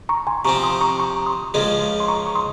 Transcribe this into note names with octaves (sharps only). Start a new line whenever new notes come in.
A#5 C#6
G#5 C6
C3 F3 C4 A#5 C#6
C6 D#6
A#5 C#6
A#5 C#6
C6 D#6
C#2 C#3 F3 G#3
C6
A#5 C#6
C#6
C6 D#6